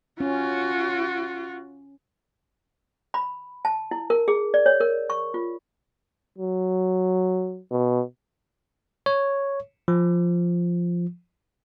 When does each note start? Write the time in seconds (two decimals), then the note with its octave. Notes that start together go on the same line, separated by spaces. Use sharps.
0.20 C#4 F4 F#4
3.14 B5
3.65 A5
3.91 E4
4.10 A#4
4.28 G#4
4.54 D5
4.66 C#5
4.81 A#4
5.10 C#6
5.34 F4
6.38 F#3
7.72 B2
9.06 C#5
9.88 F3